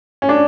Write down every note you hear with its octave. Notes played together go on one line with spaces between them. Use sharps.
C#4
D4